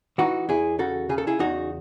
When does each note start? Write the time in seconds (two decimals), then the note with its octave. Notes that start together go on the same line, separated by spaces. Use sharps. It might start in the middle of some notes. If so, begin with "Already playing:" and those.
0.18 E3 D#4 F#4
0.49 E2 E4 G#4
0.79 C#3 F#4 A4
1.09 C#3 G#4
1.18 A4
1.27 E4 G#4
1.39 E2 D#4 F#4